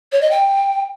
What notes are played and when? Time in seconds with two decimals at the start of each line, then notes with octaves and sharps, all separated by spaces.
0.12 C#5
0.22 D#5
0.31 G5